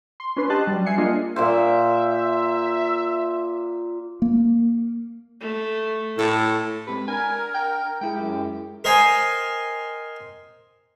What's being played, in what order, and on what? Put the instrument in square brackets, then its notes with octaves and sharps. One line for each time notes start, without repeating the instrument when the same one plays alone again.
[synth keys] C6
C#4 D4 B4 C6
G4 D#5 A5 F#6
F#3 G3
E5 G#5 C7 C#7
A#3 D4 F4 G#4 D#5
[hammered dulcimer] A#2 A#3 C5 [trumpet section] E5
[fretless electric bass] A#3
[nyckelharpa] A3
[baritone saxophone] A2 [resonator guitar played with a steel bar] A4
[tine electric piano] G#3 C4 G4 [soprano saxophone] B4
[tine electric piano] D4 [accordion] A#4 [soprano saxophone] G#5
[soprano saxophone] G5
[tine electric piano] G#3 E4 G#4 [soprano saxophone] G5
[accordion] F#2 [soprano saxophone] G4
[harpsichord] A#4 C5 D#5 G5 G#5